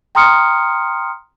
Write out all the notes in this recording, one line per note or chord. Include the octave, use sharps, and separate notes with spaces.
G5 A#5 C6 D#6 F6 C#7